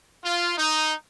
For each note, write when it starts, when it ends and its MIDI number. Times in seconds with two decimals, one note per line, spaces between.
0.24 0.56 65
0.58 0.94 63